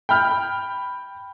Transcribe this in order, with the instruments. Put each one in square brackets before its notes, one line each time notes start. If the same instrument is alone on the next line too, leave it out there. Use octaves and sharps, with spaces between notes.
[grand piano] G5 B5 F6 G6